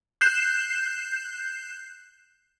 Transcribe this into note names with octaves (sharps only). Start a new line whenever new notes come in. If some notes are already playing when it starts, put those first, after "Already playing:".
F#6 G6 C7 E7